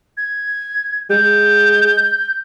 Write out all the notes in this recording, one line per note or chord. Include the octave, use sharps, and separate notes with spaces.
G#6
G#3 G6